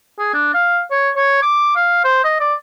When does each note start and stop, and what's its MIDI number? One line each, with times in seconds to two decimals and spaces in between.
0.19 0.31 68
0.34 0.53 62
0.54 0.80 77
0.91 1.10 73
1.16 1.40 73
1.42 1.73 86
1.76 2.03 77
2.04 2.24 72
2.24 2.37 75
2.40 2.54 74